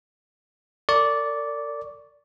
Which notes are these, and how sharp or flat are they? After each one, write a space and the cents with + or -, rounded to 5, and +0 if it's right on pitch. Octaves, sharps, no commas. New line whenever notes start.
A#4 -40 D5 -10 C#6 +5